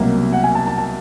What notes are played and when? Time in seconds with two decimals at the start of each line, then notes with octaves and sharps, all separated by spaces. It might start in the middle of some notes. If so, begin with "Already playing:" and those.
Already playing: C2 B2 F#3 A#3
0.33 F#5
0.44 G#5
0.55 A5
0.67 A5
0.78 A5